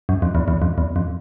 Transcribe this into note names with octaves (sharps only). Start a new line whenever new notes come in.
F#2
F2
E2
E2
F2
E2
F2